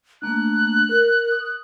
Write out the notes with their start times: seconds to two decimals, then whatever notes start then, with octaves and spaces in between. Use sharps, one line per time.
0.22 A3 A#3 D4 F#6
0.89 A#4
1.32 D#6